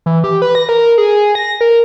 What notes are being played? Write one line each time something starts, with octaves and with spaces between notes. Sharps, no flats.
E3
G4
B4
A#6
A#4
G#4
A#6
A#4